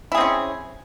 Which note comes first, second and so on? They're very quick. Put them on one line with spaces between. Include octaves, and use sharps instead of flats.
E4 G#4 C4 C#4